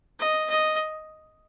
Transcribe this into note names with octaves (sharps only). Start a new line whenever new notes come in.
D#5
D#5